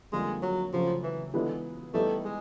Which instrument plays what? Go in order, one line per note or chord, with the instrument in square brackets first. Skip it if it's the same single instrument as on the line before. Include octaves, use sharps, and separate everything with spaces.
[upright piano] F2 D3 G3 A#3 D#4 [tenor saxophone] G#3
[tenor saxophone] F#3
[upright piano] C#3 F#3 A3 [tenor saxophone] F3
[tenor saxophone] E3
[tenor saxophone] D3 [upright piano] E3 G#3 B3 E4
[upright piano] E3 G3 B3 D#4 G4 [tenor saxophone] A3
[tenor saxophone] G#3